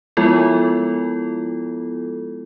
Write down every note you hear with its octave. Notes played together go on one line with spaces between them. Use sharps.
F3 G#3 B3 E4 F4 A4